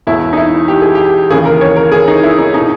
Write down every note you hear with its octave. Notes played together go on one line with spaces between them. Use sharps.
E1 E2 B2 E4
D#4
E4
G4
G#4
G4
D#2 C#3 E3 G#4
A#4
C#5
A#4
G#4
D#4
E4
D#4
B2 D#4